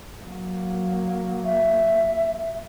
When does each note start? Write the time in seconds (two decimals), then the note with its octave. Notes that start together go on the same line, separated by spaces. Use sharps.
0.23 F#3 A#3
1.45 E5